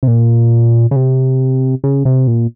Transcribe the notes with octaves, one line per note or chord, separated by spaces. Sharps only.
C3
A#2
C#3
C3
C#3
C3
A#2